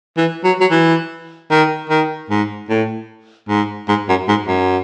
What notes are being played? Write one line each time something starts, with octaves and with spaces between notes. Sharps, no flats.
E3
F#3
F#3
E3
D#3
D#3
G#2
A2
G#2
G#2
F#2
G#2
F#2